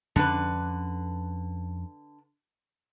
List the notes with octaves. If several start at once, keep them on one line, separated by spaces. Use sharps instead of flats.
F2 D3 C#4 B4